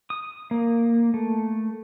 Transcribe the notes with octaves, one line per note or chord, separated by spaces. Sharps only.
D#6
A#3
A3